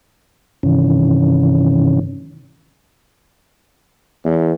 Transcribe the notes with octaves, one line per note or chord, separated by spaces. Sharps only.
G2 C3 D#3 E3 C#4
E2